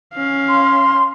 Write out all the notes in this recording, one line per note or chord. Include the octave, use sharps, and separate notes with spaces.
C#4 F5
C6